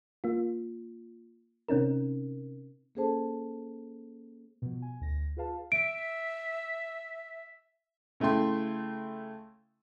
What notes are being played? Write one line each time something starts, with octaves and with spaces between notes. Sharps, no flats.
A#3 F4
C3 C4 C#4 D#4 A#4
A#3 C#4 G#4 A4 C5 A5
B2 F3
G#5
D2 A#6
F4 G#4 B4 F5 A5
E5 D7
C#3 A3 E4 G5 C6